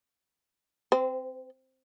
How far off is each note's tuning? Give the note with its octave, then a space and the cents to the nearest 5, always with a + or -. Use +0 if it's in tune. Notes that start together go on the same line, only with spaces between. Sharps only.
C4 +0 C5 -30